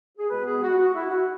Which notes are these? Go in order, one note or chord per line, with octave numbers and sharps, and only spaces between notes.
G#4
B2 G#3 B3 B4
G#4
F#4
F#4
E4
F#4